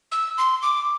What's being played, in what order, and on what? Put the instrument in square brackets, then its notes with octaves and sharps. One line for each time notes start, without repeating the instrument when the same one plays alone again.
[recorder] E6
C6
D6